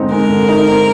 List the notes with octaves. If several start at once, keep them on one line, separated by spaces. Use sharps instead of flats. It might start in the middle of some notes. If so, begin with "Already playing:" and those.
Already playing: D3 G#3 C4 D#4
G#3 A#4
D3
D#4
C4